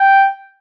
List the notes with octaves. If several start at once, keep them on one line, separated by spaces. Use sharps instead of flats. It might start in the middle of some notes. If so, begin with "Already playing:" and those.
Already playing: G5